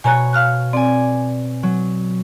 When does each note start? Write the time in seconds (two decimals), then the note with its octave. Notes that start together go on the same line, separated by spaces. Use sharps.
0.04 B2 C#5 G#5 A#5 F#6
0.33 F5 F6 F#6
0.73 C4 D5 G#5
1.63 F#3